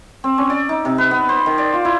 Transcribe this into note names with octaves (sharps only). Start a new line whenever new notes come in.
C4
C#4
D5
D#4
C3
B4
B3
C5
D#3
D5
F4
E4